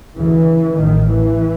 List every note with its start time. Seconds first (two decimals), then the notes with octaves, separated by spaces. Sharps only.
0.17 D2 C#3 E3
0.78 A1 A2 D#3
1.10 E3